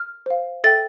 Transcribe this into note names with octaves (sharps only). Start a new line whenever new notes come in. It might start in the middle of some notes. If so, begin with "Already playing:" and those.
Already playing: F6
C5 F5
A4 E5 G5 A6